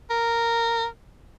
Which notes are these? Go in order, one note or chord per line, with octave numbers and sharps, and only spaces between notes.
A#4